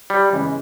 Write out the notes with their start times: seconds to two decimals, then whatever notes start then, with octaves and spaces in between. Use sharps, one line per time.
0.10 G3
0.32 C#3 E3 G#3